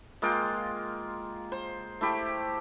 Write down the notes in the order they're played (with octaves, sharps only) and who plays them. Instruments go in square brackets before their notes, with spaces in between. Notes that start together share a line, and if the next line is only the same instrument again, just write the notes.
[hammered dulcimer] G#3 A#3 F4 G5
C5
A3 E4 G4